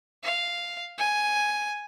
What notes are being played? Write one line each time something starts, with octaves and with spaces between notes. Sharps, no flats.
F5
G#5